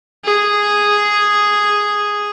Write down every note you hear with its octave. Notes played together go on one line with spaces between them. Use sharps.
G#4